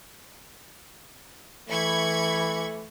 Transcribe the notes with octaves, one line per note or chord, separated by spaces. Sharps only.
E3 A3 B5 C#6 G#6